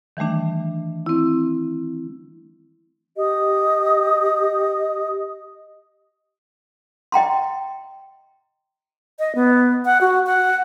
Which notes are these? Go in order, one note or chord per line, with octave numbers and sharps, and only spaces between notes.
D#3 E3 G3 A3 D4
C4 E4
G4 D#5 D#6
D#5 G5 A#5 C6
D#5
B3
F#5
F#4
F#5